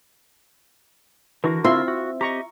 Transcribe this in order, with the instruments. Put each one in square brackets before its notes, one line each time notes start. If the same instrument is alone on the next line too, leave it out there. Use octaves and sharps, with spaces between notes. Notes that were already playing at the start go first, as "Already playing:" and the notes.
[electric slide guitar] D3 F#4 A#4 [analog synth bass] E3
[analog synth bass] C4 [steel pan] E4 F4 C6 [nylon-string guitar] E5
[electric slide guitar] F#4
[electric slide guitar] G4 D#5 [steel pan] A#5 C#6